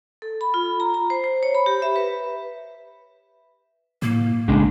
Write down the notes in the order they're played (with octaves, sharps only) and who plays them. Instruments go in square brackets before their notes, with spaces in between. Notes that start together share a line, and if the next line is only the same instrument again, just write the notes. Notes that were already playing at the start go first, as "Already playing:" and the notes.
[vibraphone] A4
B5
F4
A#5
A#5
C5
C5
C#5
B5
G4
E5
B4
[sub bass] A2 [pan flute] A#3
[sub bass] A#1 [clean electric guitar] C#3 G#3 D4